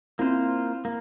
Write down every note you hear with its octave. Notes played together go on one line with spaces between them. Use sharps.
A#3 C4 E4 F4 C5
A#3